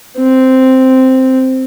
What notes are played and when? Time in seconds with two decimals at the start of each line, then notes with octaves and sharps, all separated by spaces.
0.18 C4